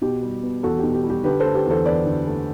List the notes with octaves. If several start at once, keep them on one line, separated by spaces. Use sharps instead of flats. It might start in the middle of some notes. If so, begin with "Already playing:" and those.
B2 G4
G3
B3
E2 F#4 A4
B2 G4
G4
G3
G4
D3 G4 B4
A4 C5
A3
G4 B4
E2 A4 C5
E2 B4 D5
D3
A3